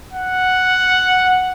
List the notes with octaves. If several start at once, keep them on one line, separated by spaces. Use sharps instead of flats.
F#5